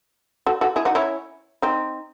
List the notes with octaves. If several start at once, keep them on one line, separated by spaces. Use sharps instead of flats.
F#4 A4
F#4 A4
E4 G#4
D#4 F#4
C#4 E4
C4 D#4